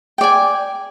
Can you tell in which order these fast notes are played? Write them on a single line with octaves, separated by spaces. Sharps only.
G5 D5 G#5